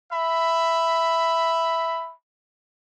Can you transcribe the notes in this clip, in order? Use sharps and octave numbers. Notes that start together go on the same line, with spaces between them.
E5 B5